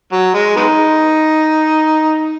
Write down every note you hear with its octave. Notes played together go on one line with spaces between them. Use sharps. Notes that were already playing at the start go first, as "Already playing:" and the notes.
F#3
G#3
G#3 B3 D#4